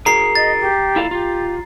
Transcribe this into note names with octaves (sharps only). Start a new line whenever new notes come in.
F#4 G#4 A#4 A#5 C7
D#5 A6
G4
E4 F4 A4
F4 G4